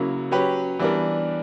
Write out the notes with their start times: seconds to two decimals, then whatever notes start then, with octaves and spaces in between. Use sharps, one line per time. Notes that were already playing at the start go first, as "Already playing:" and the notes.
Already playing: C#3 F#3 A#3 E4
0.32 F#3 C#4 G4 B4
0.79 E3 G3 B3 D4 A#4